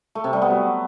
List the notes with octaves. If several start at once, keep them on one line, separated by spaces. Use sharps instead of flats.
A3
C3
G3
B3
F#3